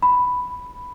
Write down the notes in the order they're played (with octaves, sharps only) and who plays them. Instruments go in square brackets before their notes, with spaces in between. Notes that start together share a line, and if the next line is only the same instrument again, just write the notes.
[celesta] B5